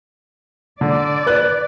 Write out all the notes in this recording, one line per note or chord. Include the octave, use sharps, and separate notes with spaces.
D3 D5
B4 F#6